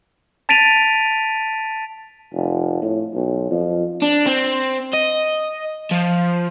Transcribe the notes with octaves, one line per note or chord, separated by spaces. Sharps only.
A5 A6 B6 D7 D#7 F7
F1
A2
B1
F2
D4
C4
D#5
F3